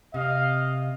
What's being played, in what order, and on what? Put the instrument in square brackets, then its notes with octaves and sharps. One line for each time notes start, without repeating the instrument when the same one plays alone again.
[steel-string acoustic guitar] C3 [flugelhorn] D#5 [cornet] F5